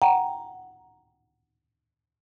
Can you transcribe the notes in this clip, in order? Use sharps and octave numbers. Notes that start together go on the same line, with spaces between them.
F#5 G5 A#5